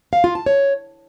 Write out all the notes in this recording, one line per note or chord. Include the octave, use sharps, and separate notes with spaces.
F5
F4
A5
C#5